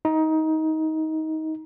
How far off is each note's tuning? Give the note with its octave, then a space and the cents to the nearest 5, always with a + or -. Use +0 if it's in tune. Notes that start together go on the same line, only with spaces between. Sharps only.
D#4 +20